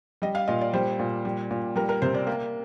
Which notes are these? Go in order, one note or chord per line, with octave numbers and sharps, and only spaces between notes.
G3 D#5
F5
A#2 D#5
D5
G3 C5
A#2
G3
A#2
G3 A#4
A#4
C3 C5
D5
A#3